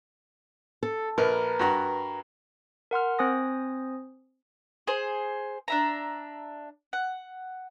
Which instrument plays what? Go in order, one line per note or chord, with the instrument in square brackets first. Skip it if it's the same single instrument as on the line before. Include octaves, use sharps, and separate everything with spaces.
[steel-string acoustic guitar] A4
[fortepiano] A#1 [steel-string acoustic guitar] A#4 B4
[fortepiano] G2 F#4 A#5
[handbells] A#4 F#5 C6 F6
C4 C5 G#5 D#6 A#6
[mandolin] G#4 C5
D4 E5 A#5
F#5